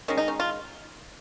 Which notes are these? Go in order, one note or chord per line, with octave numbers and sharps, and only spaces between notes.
D#3 G#3 C#4
D#4
C#4
F4